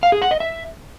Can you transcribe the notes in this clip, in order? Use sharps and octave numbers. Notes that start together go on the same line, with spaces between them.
F5
G#4
F#5
D#5
E5